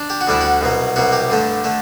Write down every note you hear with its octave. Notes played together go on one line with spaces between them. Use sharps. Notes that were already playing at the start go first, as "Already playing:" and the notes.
Already playing: D4
G4
F#4
D2 D3 G3 D4 E4
F#4
C2 B2 F#3
C2 B2 F#3 F#4
G4
G2 D3 A3
D3 A3